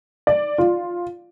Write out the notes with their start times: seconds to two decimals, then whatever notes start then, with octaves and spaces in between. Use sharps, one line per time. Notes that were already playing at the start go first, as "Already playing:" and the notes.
0.27 D5
0.58 F4